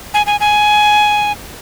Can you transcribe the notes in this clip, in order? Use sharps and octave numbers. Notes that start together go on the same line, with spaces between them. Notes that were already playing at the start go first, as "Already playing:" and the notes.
G#5
G#5
G#5